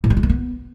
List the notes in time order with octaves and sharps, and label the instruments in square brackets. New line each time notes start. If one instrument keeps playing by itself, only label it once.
[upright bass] A2
G3
G#3
D#3
B3